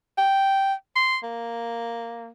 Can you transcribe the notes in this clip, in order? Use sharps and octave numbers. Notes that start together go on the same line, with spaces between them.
G5
C6
A#3